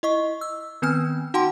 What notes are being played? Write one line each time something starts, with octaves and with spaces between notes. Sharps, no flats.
E4 D#5 C#6
E6
D#3 B3 C4 G#5 F6
D#4 F#4 F#5 G5 A5 C6